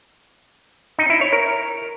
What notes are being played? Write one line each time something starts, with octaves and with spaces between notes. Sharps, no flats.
D#4
E4
C#5
A#4